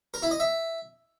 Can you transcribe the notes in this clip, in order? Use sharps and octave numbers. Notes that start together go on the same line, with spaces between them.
A#4
E4
D#5
E5